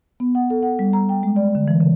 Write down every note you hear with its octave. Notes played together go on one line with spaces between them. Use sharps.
B3
F#5
A4
F#5
G3
A#5
G5
G#3
D5
D3
E3
C#3